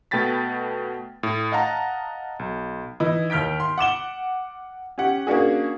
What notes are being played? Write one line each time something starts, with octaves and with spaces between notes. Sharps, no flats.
B2 A3 G5 B5 A6 B6
A2
D#5 F5 F#5 A5 A#5
B1
E3 D#4 E4
D#2 F6 G6 B6 D7
C6
F#5 D6 E7 G7
C#4 G4 F#5
A#3 C#4 D4 F#4 G#4